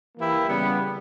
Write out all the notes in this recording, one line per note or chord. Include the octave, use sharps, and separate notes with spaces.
E3 A#3 E4 G4
C#3 G3 B3